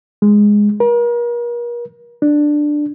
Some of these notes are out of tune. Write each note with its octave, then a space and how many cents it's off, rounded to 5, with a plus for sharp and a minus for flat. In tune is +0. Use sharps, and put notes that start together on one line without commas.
G#3 -5
A#4 +40
D4 +10